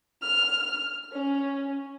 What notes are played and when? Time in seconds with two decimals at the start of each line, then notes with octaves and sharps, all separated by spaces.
0.22 F6
1.13 C#4